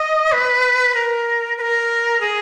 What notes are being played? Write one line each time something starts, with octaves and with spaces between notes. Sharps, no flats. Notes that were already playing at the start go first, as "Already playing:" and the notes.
Already playing: D#5
B4
A#4
B4
A#4
G#4